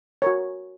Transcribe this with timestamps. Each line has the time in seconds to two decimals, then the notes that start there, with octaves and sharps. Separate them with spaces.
0.22 F#4 A#4 C#5